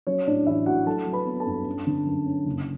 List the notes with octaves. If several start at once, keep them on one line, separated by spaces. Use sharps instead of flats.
F#3 C#4 C#5
A2 D4 D5
A1 E4 E5
A2 F#4 F#5
F#3 A4 A5
F#3
B4 B5
B3
A4 A5
G2
C#4
D3
F#2
C#4
F#1